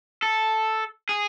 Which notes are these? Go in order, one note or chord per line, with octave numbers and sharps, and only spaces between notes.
A4
G#4